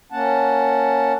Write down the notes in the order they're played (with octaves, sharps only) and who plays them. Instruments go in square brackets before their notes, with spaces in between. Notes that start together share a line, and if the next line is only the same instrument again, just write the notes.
[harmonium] A#3 C#4 F#5 A5